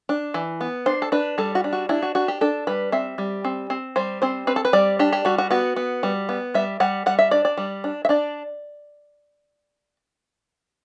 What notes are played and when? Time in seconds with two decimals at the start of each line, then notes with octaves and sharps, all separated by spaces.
0.09 D4
0.34 E3
0.61 B3
0.86 D4 C5
1.02 A4
1.12 D4 B4
1.38 G3 A4
1.55 F#4
1.64 D4
1.73 F#4
1.89 D4 E4
2.02 F#4
2.15 D4 F#4
2.28 G4
2.41 D4 A4
2.67 G3 B4
2.92 C4 E5
3.18 G3
3.45 C4
3.70 C4
3.96 G3 C5
4.22 C4 C5
4.47 C4 B4
4.56 A4
4.65 B4
4.73 G3 D5
4.99 D4 G4
5.13 G4
5.25 G3 F#4
5.38 F#4
5.51 B3 F#4
5.76 B3
6.03 G3
6.29 B3
6.54 G3 E5
6.80 G3 F#5
7.06 G3 F#5
7.19 E5
7.31 D4 D5
7.45 D5
7.57 G3
7.84 D4
8.05 E5
8.09 D4 D5